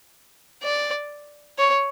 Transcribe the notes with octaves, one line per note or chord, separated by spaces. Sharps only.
D5
C#5